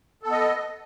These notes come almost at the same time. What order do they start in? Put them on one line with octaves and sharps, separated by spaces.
A4 B3 D#5